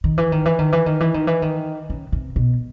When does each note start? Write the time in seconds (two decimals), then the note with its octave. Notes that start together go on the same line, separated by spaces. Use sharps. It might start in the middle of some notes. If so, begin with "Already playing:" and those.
0.04 D#3
0.18 E3
0.32 D#3
0.45 E3
0.59 D#3
0.72 E3
0.86 D#3
1.00 E3
1.14 D#3
1.27 E3
1.42 D#3
1.90 C#3
2.12 C3
2.36 B2